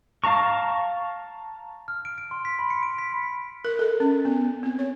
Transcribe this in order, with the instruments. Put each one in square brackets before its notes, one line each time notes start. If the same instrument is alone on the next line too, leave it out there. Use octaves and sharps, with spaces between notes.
[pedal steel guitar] F5 A5 A#5 C#6
[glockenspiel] F6
D7
D7
C6
B6
B5
C#7
D7
B6
[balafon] A#4
A4
C#4
B3
C4
C#5